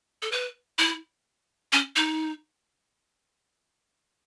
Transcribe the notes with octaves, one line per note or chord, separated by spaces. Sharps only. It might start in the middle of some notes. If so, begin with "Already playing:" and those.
A4
B4
E4
C#4
D#4